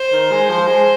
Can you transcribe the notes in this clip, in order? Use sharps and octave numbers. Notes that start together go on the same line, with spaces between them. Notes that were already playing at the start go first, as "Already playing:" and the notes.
Already playing: C5
D#3
G#3
F3 C5
G#3